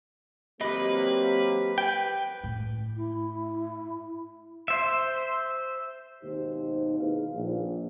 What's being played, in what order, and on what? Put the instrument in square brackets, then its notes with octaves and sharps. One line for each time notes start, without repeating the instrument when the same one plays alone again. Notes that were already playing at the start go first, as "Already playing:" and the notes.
[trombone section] F#3 A#3 C4 [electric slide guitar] G4 D#5 [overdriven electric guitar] B4
[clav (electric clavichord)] G5
[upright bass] A2
[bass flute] E4
[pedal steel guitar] C5 E5
[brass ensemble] G#1 D#2 B2 D#4 G4 C5
D#4 E4 G#4 B4 F5
A#1